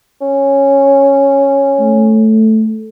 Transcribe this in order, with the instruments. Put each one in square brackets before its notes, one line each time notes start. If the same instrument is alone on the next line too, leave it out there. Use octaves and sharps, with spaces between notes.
[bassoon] C#4
[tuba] A3